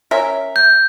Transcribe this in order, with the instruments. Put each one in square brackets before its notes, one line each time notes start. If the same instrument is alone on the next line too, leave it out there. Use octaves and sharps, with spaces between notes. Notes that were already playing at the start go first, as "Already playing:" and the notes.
[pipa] C#4 A#4 E5
[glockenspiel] G6